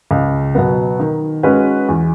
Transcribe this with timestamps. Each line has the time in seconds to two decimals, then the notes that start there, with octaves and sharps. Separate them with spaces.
0.11 C#2
0.55 B2 F#3 B3
1.00 D#3
1.43 G#3 C#4 F#4 B4
1.89 E2